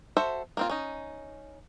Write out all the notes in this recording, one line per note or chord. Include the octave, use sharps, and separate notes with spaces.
F#4 A4 C5 E5
A#3 C4 F4
C#4 D#4